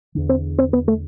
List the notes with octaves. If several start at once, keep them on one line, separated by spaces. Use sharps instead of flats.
E2 D3
C4
C4
B3
A3